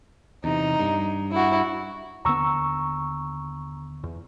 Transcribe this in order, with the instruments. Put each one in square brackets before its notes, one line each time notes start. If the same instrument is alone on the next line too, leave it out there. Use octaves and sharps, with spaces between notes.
[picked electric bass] E2 C3 [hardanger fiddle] D#4
[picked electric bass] G2
[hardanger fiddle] E4 F#4
[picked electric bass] D#2 D3 B3 [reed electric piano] A#5 C#6 E6
[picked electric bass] E2